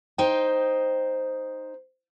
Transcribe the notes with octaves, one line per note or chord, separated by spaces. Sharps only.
D#4 C5 G5